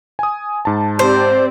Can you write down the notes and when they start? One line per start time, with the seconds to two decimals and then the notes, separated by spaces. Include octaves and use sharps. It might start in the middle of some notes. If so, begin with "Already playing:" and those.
0.19 G#5 D#6
0.65 G#2 A5
0.99 C4 G4 C5 D5